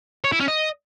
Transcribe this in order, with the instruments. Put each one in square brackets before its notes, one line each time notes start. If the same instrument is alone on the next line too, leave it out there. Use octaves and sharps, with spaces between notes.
[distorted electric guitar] C#5
E4
C#4
D#5